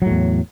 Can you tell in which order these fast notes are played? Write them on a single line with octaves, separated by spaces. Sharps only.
F#3 A2 E2